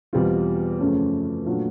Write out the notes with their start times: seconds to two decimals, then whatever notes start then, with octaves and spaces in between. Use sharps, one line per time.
0.13 E2 B2 G3 C4 F4
0.79 F#2 C#3 F3 A3 C#4
1.46 A#2 F#3 A3 D4 F4